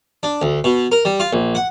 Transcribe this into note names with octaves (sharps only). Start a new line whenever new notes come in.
D4
D2
B2
A#4
G3
F4
A#1
F#5